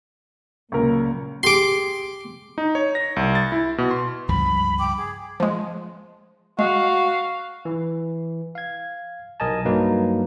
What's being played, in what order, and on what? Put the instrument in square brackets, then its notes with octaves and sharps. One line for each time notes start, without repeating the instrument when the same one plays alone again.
[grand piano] C#2 A#4 [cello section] A#2 F#3
[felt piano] G4 G#4 [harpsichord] C6 D6
[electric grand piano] D#4
C#5
A#6
C2
A6
E4
B2
C6
[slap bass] C#2 G2 F3 [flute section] B5
[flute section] G5 D6
G#4
[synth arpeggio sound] F3 G#3
[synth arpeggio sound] G#3 [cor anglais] F#4 [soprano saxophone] F5
[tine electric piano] E3
F5 G#6
B1 A#4 D#5 G#5 A5
G2 F#3 A#3 D#4 B4